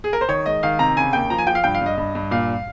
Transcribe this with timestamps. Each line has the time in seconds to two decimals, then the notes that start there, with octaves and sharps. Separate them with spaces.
0.04 G#4
0.13 A#4
0.21 C5
0.28 D#3 C#5
0.46 G#3 D#5
0.63 D#3 F5
0.79 C3 A#5
0.97 C#3 G#5
1.13 D#2 G5
1.30 F3 A#5
1.38 G#5
1.47 F3 G5
1.55 F5
1.64 G2 G5
1.75 F5
1.81 G2 D#5
1.97 G2
2.15 G2
2.31 A#2 F5